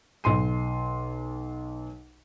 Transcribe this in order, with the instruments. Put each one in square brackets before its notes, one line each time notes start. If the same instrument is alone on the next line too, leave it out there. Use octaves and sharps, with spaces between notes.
[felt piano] B1 C6 D#7